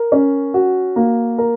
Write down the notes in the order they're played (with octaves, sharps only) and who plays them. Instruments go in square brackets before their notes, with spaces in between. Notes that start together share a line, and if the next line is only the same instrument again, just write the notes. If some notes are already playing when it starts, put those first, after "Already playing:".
Already playing: [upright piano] A#4
C#4
F#4
A#3
A#4